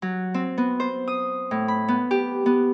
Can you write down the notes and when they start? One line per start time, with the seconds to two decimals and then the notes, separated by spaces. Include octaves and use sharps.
0.02 F#3
0.34 C4
0.58 B3
0.80 C5
1.08 D#6
1.51 A2
1.68 B5
1.88 B3
2.11 G4
2.46 B3